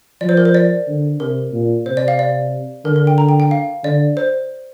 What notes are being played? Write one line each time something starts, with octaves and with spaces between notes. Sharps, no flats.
F3 D5
C5
A#4
C5
D5
D3
C3 A#4
A#2
C3 C5
D5
F5
D5
D3 A#4
A#4
G5
A#5
G5
G5
F5
D3 D5
C5